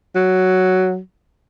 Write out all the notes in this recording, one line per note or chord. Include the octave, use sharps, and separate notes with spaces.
F#3